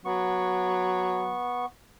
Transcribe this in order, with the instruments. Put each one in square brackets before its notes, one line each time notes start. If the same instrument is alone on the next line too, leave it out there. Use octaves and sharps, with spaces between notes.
[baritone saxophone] F#3 [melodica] B3 C#6